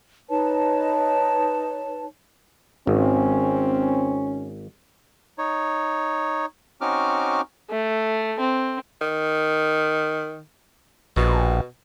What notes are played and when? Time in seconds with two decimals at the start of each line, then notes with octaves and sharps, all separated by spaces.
0.29 D#4 B4 C#5 A5
2.87 G#1 C4 C#4
5.38 D#4 C#5
6.81 C4 C#4 D#4 F#4 D6 F6
7.70 A3
8.40 C4
9.01 D#3
11.16 A#1 B2